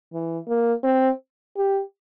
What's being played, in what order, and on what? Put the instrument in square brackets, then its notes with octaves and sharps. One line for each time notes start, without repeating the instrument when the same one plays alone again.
[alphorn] E3
A#3
C4
G4